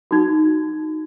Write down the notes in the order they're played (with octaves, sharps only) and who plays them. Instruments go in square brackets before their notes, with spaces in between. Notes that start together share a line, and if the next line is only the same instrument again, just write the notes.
[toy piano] D#4 F#4